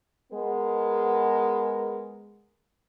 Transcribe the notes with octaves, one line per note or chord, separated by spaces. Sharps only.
G#3 B3 A#4